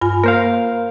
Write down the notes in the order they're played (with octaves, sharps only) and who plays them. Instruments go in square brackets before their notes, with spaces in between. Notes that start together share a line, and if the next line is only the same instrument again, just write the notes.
[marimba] G2 F4 G#5
[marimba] A#3 [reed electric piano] A#4 C5 F5